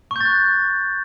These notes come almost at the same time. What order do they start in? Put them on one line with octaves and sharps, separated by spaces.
C#6 G6 A6 F#6